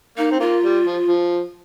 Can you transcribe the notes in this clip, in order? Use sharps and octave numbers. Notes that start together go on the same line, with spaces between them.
A#3 D#4
C4
A#3 F4
G3
F3
F3